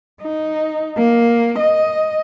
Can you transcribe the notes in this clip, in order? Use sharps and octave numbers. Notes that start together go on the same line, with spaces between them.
D#4
A#3
D#5